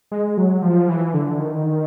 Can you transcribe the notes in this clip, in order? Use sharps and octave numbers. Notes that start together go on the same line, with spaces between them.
G#3
F#3
F3
E3
D3
D#3